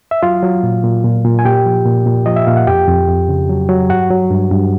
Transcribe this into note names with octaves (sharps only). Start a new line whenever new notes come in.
E5
F#3 F4 F5
F#3
A#2
A#2
A#2
A#2
G#5
A#2 G4 G5
F3
A#2
A#2
F3 D#5
E5
A#2 F5
F#5
F2 G4 G5
F2
F2
C#3
F#3
F#3
G2 F#4 F#5
F#3
G2
G2